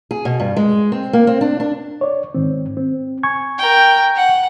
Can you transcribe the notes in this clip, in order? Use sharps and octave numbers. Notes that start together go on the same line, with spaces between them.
G#4
B2
G2
G#3
C4
A#3
C4
D4
D4
C#5 D5
G#2 D#3 C4
C4
G#5 C#6 G#6
A#4 G5
F#5